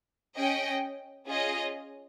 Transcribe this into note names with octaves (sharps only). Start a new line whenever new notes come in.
C#4 G#4 D#5 G5
C#4 F4 G#4 D#5